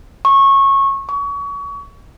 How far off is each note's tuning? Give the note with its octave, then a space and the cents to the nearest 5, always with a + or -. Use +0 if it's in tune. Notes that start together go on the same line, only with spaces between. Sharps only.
C#6 -20
C#6 +30